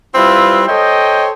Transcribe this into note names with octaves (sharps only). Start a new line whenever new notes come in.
G3 C4 E4 F4 B4
A4 C5 C#5 D#5 G5